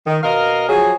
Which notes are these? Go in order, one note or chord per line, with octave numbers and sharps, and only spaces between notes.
D#3
B2 A#4 D#5 F5
F3 F#3 G#4